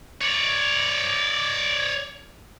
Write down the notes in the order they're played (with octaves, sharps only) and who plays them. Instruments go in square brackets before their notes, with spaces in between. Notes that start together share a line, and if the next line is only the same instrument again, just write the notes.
[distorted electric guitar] C#5 D5